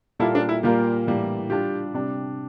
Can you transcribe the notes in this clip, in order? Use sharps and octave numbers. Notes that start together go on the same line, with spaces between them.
A#2 G3 A#3 E4 F4 A4
D4
E4
A#2 G3 A#3 F4 G4 A#4
A2 E3 G3 A#3
G3 D4 F4 G4
C3 G3 D4